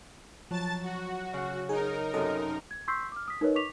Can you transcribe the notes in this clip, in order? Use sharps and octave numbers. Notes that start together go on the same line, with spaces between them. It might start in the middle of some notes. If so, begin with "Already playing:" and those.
F3 F#3 A5 A6
F#4
C#3 F#5
D#4 G#4 A#4
F#2 C3 A4 D#5
G#6
C6 C#6 E6 G6 B6 C7
D6 F6
D#6 B6
D#4 A#4 B4 C#5 D#5
C#6 D6 B6 F7